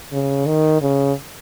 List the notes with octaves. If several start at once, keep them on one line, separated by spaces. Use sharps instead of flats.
C#3
D#3
C#3